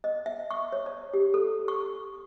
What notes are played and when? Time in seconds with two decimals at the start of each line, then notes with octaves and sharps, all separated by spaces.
0.04 D#5
0.26 E5
0.51 C#6
0.72 C#5
0.86 D5
1.13 G4
1.34 A4
1.68 C#6